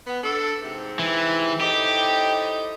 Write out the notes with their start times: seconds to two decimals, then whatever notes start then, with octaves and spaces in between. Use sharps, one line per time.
0.07 B3
0.24 D4 A4
0.63 G#2 C3
0.99 E3
1.61 A2 C3 D#4 G4